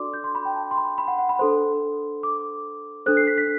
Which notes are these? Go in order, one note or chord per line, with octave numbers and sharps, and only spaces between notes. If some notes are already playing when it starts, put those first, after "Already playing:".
Already playing: D4 F#4 A4 D5 C6 D6
G6
C6
B5
G5
A5
C6
B5
B5
F#5
F#5
B5
D4 A4 C5 C6
D6
D4 A4 C5 F#6
C7
B6
B6